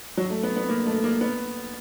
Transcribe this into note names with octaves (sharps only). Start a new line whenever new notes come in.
F#3
A3
B3
B3
A#3
A3
A#3
B3